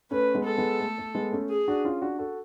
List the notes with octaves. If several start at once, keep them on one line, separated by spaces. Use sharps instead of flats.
A3 C#4 B4
G#3 B3
A4
G#3 B3
A3
A3
G#3 B3
A3 C#4
G#4
D4 F#4
C#4 F4
D4 F#4
F#4 A4